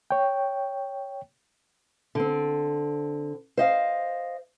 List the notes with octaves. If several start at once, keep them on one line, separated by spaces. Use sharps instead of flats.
C#5 G5
D3 C4
C5 D#5 F5